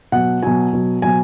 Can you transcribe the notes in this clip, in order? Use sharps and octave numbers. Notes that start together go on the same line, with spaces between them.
B2 F#3 F#5
B2 F#3 G#5
B2 F#3
B2 F#3 G#5